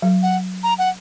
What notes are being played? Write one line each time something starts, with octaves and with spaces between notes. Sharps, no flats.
F#3
F#5
A#5
F#5